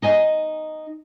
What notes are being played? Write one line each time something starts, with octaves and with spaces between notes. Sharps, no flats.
D#4 D#5 G#5